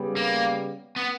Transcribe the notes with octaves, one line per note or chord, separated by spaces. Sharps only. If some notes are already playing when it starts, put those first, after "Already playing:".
Already playing: C#3 G3 B3
A#3
B3